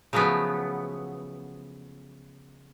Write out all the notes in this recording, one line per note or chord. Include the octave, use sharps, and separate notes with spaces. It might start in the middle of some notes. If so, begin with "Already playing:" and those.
C#3 F3 F#3 A3 B3